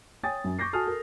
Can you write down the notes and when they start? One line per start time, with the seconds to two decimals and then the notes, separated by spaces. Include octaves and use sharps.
0.23 C#5 G5 G#5 D#6 A6
0.44 F#2
0.59 C#6 D6 G6 A#6 C7
0.73 F#4 A4 G#5 A5 D#6 F6
0.87 A4 A#4